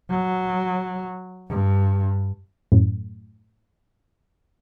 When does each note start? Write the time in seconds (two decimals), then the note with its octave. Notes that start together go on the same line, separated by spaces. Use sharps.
0.10 F#3
1.48 G2
2.72 F#2 A2